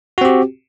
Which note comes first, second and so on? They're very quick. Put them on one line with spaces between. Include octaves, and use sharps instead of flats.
F#4 C4 G4